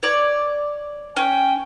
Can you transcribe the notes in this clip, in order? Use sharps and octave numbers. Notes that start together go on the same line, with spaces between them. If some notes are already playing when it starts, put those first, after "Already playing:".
C#5 D5
C#4 G5